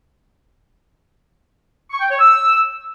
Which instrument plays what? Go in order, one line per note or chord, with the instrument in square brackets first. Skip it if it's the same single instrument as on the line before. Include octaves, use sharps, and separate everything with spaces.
[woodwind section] C#6
G5
C#5
E6